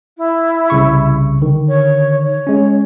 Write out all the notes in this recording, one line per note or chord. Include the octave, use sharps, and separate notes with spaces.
E4
C2 C#3 C#6
D3 D#3
C#5
C#5
G#3 C#4